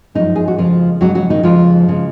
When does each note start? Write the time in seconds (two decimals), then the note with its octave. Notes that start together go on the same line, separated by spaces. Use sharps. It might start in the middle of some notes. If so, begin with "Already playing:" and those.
0.15 F#2 D#3 F3 G#3 D#4
0.36 G#4
0.48 F#4
0.58 F2 C#3 F3 G#3 F4
1.01 F2 C#3 F#3 G#3 F#4
1.15 F#3 F#4
1.30 D#3 D#4
1.43 F2 C#3 F3 G#3 F4
1.88 C#3 G#3